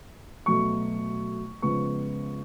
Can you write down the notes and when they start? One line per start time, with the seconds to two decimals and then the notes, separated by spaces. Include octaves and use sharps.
0.46 B2 F#3 A3 C#6
1.62 C#3 F3 G#3 B3 C#6